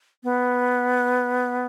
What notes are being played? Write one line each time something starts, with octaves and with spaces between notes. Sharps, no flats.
B3